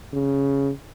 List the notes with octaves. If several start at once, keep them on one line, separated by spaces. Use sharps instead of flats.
C#3